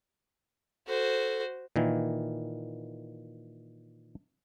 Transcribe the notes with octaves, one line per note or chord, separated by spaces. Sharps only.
F#4 A4 C5
A#2 D#3 E3